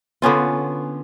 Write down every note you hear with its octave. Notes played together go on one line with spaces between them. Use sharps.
D3 B3 C#4 F4